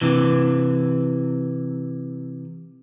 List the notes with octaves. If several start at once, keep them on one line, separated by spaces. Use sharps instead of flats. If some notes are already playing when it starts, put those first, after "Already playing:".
C3 E3